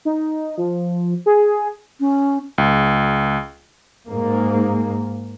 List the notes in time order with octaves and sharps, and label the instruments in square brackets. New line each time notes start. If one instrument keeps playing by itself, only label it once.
[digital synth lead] D#4
F3
G#4
[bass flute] C#4
[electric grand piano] C#2
[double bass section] G#2 A#3